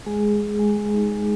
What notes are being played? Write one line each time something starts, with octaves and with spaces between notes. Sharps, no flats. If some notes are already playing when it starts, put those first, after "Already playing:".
G#3 G#4
G#3
G#3
G#3
G#3
D#4
G#3